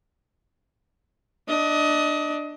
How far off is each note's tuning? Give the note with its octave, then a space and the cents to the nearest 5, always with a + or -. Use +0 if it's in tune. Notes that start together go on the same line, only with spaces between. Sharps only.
D4 +15 D#5 +25